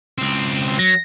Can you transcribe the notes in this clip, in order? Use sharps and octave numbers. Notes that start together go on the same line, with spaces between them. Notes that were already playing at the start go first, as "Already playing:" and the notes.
C#2 C4
F#3 A#6